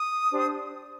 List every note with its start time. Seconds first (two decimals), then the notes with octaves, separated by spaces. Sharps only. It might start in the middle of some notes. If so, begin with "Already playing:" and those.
Already playing: D#6
0.30 D4 G4 C5